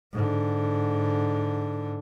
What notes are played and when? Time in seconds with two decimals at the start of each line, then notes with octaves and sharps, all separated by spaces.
0.13 G#2 D3